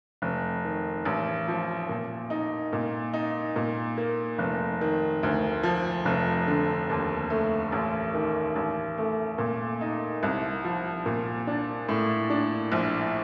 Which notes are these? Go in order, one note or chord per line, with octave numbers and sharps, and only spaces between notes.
F1
D#3
A1
F3
A#2
D#4
A#2
D#4
A#2
A#3
F1
D#3
D2
F3
F1
D3
D#2
A3
A1
D#3
A1
A3
A#2
D#4
C2
F3
A#2
D4
A2
D4
A#1